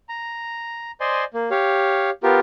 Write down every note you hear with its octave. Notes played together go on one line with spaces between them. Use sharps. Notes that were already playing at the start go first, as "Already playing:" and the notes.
A#5
C5 D5 D#5 G#5 C6
A#3
G4 C#5 F5
B3 F4 G4 A#4